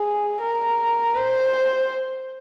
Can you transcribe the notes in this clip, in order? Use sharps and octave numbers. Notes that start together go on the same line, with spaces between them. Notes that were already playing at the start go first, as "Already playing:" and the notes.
Already playing: G#4
A#4
C5